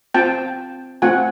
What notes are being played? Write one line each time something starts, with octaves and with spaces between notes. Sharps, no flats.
C4 F4 G5 A5
A3 C4 F4 F#5 G#5